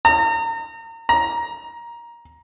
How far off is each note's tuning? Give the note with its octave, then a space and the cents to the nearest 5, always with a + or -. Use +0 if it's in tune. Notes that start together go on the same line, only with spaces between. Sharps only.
A#5 -35
A#5 +15